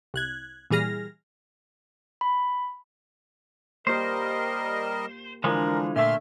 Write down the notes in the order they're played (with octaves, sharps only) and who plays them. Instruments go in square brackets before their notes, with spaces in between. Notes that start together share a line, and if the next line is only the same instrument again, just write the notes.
[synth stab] C2 F#6 G#6
A#2 E3 G3 G#4 F6 A#6
[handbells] B5
[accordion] G3 A#4 D#5 [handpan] A#3 G4 [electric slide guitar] C5
[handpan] D3 [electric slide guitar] E3 F3 G#3 [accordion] D4 [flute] A#4
[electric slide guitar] A#2 A3 [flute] E5 [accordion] C6 F6